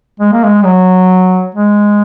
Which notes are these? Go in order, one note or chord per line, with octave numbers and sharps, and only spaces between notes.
G#3
A#3
G#3
F#3
G#3